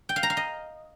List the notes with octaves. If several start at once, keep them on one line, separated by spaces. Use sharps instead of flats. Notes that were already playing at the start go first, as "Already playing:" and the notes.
G5
F5
A#5
F5
D#5